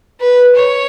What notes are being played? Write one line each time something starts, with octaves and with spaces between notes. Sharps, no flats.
B4
C#5